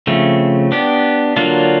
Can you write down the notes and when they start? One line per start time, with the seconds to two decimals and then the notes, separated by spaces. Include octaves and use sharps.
0.07 C#3 F3 A3 C4
0.72 B3 D4 G4
1.36 D3 F#3 A#3 D4 F4